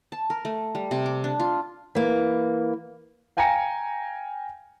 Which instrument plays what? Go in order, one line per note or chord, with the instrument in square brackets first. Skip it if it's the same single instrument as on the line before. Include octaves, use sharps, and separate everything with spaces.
[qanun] A5
A#4
A3
G3
C3
D6
D4
F4
[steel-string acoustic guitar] E3 A#3
[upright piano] F5 G5 G#5 A#5 A#6 C#7